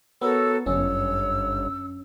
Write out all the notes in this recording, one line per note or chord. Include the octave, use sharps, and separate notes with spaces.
B3 F#4 A4 A#4 C#5 E6
G1 F#2 C#4 C#5 E6